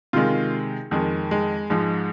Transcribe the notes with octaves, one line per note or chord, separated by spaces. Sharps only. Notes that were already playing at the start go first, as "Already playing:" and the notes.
C3 D#3 G#3 F4
F2 D#3 G#3
G#3
G#2 F3 G#3